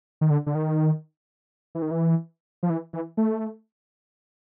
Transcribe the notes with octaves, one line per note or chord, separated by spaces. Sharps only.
D#3
D3
D3
D#3
E3
D#3
E3
F3
E3
E3
A3